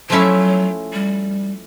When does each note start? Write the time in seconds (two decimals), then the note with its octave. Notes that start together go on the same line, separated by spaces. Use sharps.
0.10 F3 F#3 A3 C#4 E4
0.93 G3